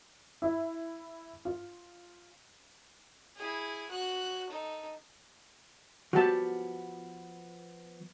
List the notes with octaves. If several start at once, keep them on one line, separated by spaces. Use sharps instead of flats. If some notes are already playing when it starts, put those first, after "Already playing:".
E4
F4
E4 G#4
F#4 F#6
D#4 A4
F3 B3 F#4 G4 A5